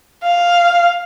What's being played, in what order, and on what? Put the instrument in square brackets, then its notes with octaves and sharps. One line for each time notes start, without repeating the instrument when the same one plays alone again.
[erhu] F5